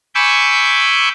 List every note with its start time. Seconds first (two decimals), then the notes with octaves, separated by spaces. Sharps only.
0.15 G#5 B5 C#6 D6 E6 G6